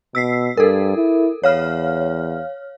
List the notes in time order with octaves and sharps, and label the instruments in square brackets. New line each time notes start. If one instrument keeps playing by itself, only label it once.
[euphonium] B2 [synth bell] E6 B6 C7
[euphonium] G2 [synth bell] A4 A#4
[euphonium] E4
[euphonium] E2 [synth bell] C#5 F5 F6